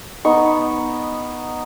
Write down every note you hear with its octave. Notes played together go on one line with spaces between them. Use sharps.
B3 D#4 C#6